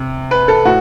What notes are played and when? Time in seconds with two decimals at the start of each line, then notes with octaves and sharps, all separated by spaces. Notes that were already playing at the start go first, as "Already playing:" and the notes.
Already playing: C3
0.31 B4
0.48 A4
0.65 A2 F#4